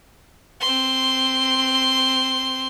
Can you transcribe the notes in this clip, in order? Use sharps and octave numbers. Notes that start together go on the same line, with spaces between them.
C4 C6